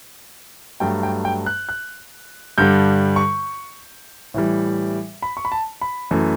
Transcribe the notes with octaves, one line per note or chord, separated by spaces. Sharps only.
G2 F#3 A3 G5
G5
G5
F#6
F#6
G2 D3 G3 G6
C#6
A2 E3 G3
B5
C#6
B5
A5
B5
F#2 E3 A3